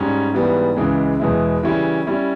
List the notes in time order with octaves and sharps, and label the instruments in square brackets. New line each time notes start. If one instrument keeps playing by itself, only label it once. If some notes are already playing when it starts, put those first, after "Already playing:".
Already playing: [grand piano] G#2 G3 C#4
G#2 E3 G3 B3
C#2 C#3 E3 G#3
E2 B2 G#3 B3 E4
C#3 E3 G3 C#4 E4
G3 C#4 E4